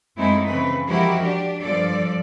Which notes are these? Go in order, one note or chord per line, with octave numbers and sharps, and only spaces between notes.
F#2 G#3 A3 C4 D#4 E4
C#3 E3 C4 B4
F3 G#3 E4 F#4 G4 A#4
D4 G4
G2 F3 A4 D5